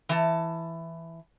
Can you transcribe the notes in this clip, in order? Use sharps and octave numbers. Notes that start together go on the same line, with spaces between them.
E3 A5